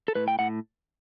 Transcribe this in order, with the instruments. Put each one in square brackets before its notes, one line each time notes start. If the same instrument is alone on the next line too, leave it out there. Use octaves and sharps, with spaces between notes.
[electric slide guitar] A4
A2 B4
G5
A2 F#5